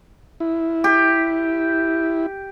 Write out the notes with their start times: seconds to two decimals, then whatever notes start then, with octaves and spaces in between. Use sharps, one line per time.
0.40 E4
0.84 G4